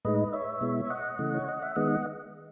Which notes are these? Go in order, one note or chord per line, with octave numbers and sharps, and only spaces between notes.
A2 G#3 D#4 B4 D#5
C#5 E5
B2 G#3 B3 E4
D#5 F#5
C#3 E3 A3
C#5
D#5
E5
D#3 G#3 B3 D#5 F#5